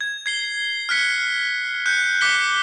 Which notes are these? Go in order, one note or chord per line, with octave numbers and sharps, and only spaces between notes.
G#6
G#6 C7 G7
F6 F#6 B6 C#7
F#6 G6 C#7
D6 F#6 B6 C#7 G7